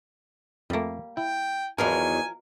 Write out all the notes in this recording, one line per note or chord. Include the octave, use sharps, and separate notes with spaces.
F2 G3 A3 A#3
E4 G5
E2 D#3 F3 F#3 A#4 G#5